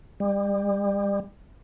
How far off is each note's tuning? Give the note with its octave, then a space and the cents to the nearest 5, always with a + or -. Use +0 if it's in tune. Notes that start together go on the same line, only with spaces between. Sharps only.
G3 +35